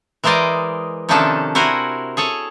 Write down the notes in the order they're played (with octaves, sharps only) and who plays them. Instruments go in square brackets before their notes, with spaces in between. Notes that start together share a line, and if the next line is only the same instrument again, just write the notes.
[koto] E3 G#3 A#4 C5 D5 D#5
C3 D#3 F3 C#4 D4 A4
E4 F#4 A#4 C5 G#5
G#4 A4 C#5